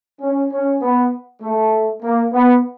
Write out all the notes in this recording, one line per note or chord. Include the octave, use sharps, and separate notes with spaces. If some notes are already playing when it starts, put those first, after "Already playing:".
C#4
C#4
B3
A3
A#3
B3